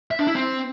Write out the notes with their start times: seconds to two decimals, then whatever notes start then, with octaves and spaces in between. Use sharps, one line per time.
0.11 E5
0.19 D4
0.27 E4
0.35 C4